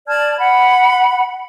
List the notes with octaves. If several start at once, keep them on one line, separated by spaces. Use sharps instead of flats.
D5 A5 F6 G#6
F#5 B5